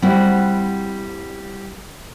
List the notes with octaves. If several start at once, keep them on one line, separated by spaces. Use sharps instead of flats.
G3 C4 E4 F#4